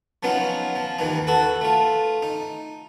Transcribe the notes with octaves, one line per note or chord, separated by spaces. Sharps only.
F3 F#3 B3 C#4 D#4 F4
F3
D#2 D#3 E3 D#4
F#4 A4 B4
A3 F4
D#4